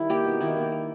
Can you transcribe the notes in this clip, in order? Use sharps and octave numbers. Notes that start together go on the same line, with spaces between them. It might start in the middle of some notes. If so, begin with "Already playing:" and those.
Already playing: D#3 G3 E4
A#3 G4
B2
D#3 E4
A#3
A#3